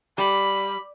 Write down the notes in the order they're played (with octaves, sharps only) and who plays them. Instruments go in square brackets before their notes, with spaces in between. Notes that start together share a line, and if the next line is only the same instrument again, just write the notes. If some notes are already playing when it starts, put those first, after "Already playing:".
[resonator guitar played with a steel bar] G3 [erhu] B5